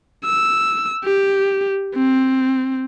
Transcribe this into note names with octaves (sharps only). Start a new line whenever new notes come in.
E6
G4
C4